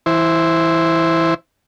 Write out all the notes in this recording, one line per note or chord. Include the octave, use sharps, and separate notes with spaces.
E3 E4 C5